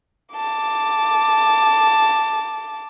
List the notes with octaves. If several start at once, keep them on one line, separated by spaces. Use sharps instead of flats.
A5 D6